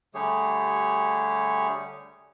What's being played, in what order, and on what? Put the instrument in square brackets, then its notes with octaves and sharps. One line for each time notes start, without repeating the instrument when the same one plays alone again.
[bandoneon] D3 G3 A3 G4 G#4 C#5